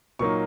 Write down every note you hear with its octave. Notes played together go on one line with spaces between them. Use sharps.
A#2 F#3 A#3 D#4 C#6